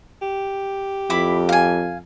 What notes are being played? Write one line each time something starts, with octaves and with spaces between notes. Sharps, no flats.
G4
F2 E4 B5 D6
F5 G#5